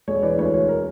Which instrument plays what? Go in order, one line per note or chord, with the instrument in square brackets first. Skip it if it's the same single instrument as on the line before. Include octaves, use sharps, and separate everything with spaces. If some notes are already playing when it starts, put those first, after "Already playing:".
[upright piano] E1 C#5
E3 D5
D2 C#5
E1 C#5
A#4